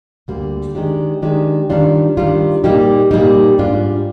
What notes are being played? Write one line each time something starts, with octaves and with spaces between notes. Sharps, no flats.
D2 D3 G3 A#3
D#3 G#3 D4 G4
D#3 G#3 D4 G4
D#3 G3 D4 F4
D#3 G3 D4 F4
A#2 G3 A#3 D#4 G4
A#2 G3 A#3 D#4 G4
G#2 G3 D4 F4